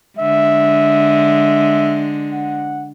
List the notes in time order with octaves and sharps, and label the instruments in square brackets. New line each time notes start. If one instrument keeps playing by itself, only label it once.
[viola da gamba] D3 G#3 [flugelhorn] E5
[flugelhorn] F#5